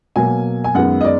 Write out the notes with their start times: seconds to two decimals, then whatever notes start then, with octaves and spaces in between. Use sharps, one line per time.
0.16 B2 F#3 A#3 G#5
0.64 G#5
0.74 F#2 D#3 G#3 B3 F#5
1.01 D#5
1.05 D5